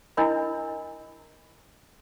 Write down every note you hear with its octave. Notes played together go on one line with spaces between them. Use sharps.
D4 E4 A#4 D#5 B5